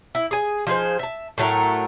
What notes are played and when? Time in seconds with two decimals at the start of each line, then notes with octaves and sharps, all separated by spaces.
0.15 E4
0.31 G#4 G#5
0.67 F3 D#4 G#4 C5
0.99 E5 A5
1.38 A2 F#3 A3 A#4